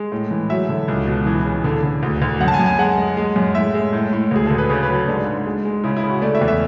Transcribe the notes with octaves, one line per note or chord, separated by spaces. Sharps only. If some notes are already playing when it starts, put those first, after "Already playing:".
Already playing: G#3
A2
E3
F#3 E5
D3
C#2
B2
E3
C#3
D3
D3
D2
D2
F#2 F#5
A5
G#5
F#2
G#5
G#3 F#5
G#3
G#3
F#2
A2 E5
G#3
A2
A2
D2 G#4
D2 A4
B4
C#3 C#5
B4
F#3
A4
G#2 D4
G#2
G#3
G#3
C#3 E4
E4
C#3
F#4
A3 D5
E5
E2
E5